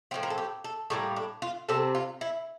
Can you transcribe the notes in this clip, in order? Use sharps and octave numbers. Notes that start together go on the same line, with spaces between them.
A2 F3 C4 F4
A#4
A4
G4
A4
A2 G3 A#3 A4
D4
F4
C3 G3 C4 A4
F4
E4